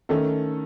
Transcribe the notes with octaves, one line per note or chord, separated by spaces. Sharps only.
D#3 A3 C#4 A4